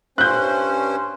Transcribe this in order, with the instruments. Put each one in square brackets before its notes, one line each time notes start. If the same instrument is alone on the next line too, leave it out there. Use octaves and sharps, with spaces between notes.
[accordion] G2 C#4 C5 [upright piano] F#6 G6